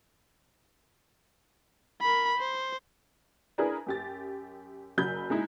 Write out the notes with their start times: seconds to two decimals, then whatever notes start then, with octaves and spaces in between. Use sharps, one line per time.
2.02 A#4 B5
2.38 C5
3.58 D4 E4 G#4 A#4 B4
3.87 F#2 G4 A6
4.98 F#1 F#3 B5 G6
5.30 G#3 D#4 E4